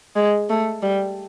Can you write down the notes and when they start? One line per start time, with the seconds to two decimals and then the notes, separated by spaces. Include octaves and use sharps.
0.16 G#3
0.49 A3
0.82 G3